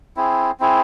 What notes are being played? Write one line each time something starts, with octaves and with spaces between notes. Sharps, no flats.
C4 E4 G#4
C4 E4 G#4